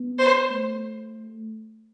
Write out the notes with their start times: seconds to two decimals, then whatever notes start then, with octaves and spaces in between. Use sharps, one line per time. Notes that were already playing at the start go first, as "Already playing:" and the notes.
Already playing: B3
0.18 C5
0.50 A3